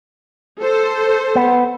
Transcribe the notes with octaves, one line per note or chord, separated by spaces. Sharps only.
A4 C5
B3